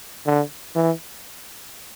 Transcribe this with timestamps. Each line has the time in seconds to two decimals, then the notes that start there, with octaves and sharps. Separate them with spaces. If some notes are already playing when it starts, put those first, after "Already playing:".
0.26 D3
0.76 E3